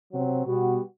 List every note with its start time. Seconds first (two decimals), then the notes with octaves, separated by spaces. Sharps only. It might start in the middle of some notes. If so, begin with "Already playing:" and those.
0.12 C3 F#3 C4
0.45 B2 G3 B3 F#4